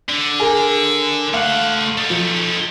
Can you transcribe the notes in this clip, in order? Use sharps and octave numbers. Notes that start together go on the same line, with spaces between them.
D3
G#4 A#4
A3 F5 F#5
D#4 A4
F3